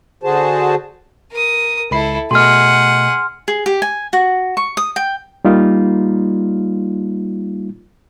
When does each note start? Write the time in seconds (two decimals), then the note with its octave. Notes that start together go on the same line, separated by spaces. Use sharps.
0.23 D3 F#4 G#4 C5 A5
1.31 A#4 D#6
1.91 C#2 E4 A4 B5 C7
2.31 B2 A3 G#4 D#5 F#5 C6 F6
3.48 G#4
3.66 G4
3.82 G#5
4.13 F#4
4.57 C#6
4.77 D#6
4.96 G5
5.45 G3 A#3 D#4 F4